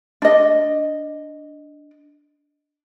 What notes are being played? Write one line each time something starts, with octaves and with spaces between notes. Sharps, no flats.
D4 D#5